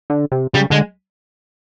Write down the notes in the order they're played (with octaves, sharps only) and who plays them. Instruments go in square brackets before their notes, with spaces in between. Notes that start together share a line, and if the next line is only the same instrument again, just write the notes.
[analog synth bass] D3
C3
[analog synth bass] C#3 [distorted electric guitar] G3
[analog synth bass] D3 [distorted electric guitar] G#3